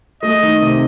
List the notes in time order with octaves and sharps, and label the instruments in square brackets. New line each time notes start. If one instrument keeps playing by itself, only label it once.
[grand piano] A3 [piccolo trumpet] D#5
[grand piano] D#3
C3